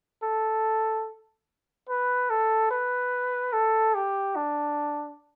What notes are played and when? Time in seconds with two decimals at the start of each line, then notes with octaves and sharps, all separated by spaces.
0.23 A4
1.89 B4
2.30 A4
2.71 B4
3.53 A4
3.95 G4
4.36 D4